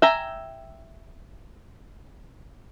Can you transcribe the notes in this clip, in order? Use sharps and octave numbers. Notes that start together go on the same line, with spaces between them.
E5 G5 G#5 A#5